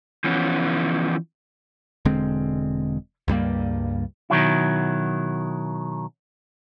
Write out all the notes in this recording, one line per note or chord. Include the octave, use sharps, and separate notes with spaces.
E3 F3 B3 C#4
E1 D3 G#3 C4
C#2 G2 G3 A#3
B2 D#3 F#3 E4